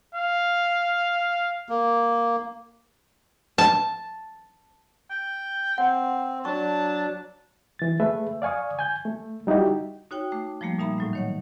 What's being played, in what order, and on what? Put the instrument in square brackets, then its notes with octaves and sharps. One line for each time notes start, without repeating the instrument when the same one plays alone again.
[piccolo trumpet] F5
[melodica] A#3
[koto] A5
[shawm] G5
[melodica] C4 [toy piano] F#5
[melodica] F#3 D4 [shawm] A5 [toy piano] C#6
[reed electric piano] E3 A6
A3 G#4 B4 E5
D5 F5 G#5 C#6 D#6
G#5 G6
A3
G3 D#4 E4 F#4 G4
[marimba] D#4 F#4 C#5 G5
A3 D6
F3 G3 A3 A#3
A#2 G3 D#4 E5 A#5 B5
A2 F#3 A3
D#3 C#5 F#5